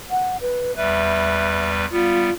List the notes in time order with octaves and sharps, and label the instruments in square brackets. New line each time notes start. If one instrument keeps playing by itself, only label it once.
[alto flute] F#5
B4
[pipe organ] E2 G3 B4 [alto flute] E5
[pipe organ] G3 B3 [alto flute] F4